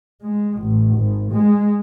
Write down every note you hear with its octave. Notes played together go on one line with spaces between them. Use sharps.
G#3
A1
G#1
G#3